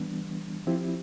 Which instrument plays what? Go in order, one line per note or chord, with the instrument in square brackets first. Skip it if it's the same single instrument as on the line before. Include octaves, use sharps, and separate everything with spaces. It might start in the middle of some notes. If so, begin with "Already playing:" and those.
Already playing: [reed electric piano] E3 G3 B3 D4
F3 C4 E4 G4